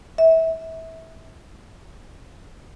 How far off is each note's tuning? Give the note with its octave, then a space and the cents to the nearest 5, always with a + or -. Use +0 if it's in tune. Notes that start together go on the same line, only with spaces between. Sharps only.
E5 -25